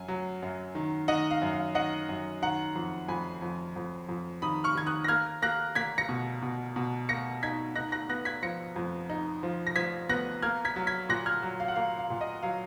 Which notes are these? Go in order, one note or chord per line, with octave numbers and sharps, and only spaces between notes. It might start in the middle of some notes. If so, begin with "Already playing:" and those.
Already playing: F#2 G#5
F#3
F#2
D#3
D#3 D#5 F#5
F5
F#2
F5
D#3 D#5 F#5
F#2
D#3 F#5 A#5
F2
F2 G#5 B5
F2
F2
F2
D#3 B5 D#6
C#6 F6
D#3 G#6
D#6 F#6
A#6
A#3 F6 G#6
A#3 F#6 A#6
A#3 G#6 B6
A#6 C#7
B2
B2
B2
A#3 A#6 C#7
D#4 G#6 B6
D#4 F#6 A#6
F#6 A#6
B3 F#6 A#6
G#6 B6
F3 A#6 C#7
F2
D#4
F3
A#6
F3 G#6 B6
B3 F#6 A#6
A#3 F6 G#6
G#6 B6
F#3
G#6 B6
A#2 F#6 A#6
F6 G#6
F#3
F5
F#5
A#3 F5
F5
A#2
D#5
F#3 F5